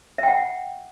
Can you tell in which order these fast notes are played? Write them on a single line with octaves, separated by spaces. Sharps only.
E5 G5 F#5